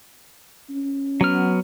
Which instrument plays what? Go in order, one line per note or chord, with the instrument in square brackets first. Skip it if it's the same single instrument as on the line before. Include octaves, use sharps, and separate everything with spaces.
[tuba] C#4
[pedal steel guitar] F#3 B3 F6